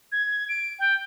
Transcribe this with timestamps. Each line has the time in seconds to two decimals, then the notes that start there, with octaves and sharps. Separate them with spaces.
0.12 G#6
0.49 D7
0.79 G5